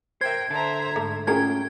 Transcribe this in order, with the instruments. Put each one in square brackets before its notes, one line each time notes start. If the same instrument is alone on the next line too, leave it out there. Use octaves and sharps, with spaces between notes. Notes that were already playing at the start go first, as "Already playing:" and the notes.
[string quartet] A#4 G5 [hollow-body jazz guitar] C5 E5 [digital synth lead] G#6
[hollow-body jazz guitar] D3 A5 [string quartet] C5 E5 A#5
[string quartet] G#2 [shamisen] A3
[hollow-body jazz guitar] A3 C#4 F4 [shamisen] F#4 G#4 A#4 [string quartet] G5 [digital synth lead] G#6